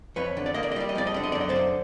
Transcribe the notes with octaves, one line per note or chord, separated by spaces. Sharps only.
F2 B4 C#5
D3
D5
A#3 D#5
D5
D#5
G3 D5
D#5
F2 D5
D#5
D3 D5
D#5
F#2 D5
D#5
C5 D5
D3